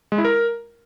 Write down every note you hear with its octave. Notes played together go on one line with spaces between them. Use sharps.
G#3
E4
A#4